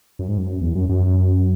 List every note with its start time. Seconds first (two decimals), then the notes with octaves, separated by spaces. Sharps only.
0.19 F#2
0.28 G#2
0.38 F#2
0.61 E2
0.75 F#2
0.89 F#2